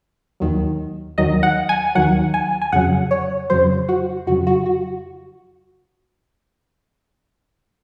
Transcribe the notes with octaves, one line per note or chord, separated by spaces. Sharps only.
D#2 D#3 F#3
D#2 D#3 F#3 D#5
F#5
G#5
D#2 D#3 F#3 F#5
G#5
G#5
F2 C#3 F#3 F#5
C#5
F2 C#3 F#3 C5
F#4
F2 C#3 F#3 F#4
F#4
F#4